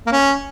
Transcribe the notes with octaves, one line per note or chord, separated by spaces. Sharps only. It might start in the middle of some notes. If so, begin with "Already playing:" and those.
A#3
C#4